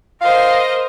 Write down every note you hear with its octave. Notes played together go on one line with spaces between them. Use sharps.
A#4 C5 D#5 F5